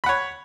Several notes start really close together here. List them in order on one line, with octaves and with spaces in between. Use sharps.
B5 F#5 C#5